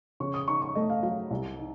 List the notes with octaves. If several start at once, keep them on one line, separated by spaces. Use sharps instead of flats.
C#3 C#6
D#6
D#4 C#6
C#6
A3 D#5
F5
F#3 F5
C2
D#4